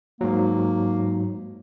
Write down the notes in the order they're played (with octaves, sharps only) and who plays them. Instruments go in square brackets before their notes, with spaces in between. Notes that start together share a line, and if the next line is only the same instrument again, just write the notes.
[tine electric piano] G#2 F#3 [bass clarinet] A#3